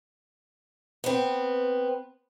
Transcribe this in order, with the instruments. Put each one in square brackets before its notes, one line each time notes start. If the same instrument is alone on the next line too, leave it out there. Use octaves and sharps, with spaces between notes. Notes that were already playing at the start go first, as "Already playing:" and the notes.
[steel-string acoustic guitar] B3 C4